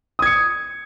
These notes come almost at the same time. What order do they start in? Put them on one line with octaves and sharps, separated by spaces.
D#6 G#6 C#7